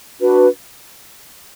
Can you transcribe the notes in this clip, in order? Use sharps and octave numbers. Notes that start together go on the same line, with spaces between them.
D4 F#4 B4